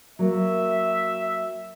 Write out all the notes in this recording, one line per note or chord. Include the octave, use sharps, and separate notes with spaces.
F#3 A#3 E5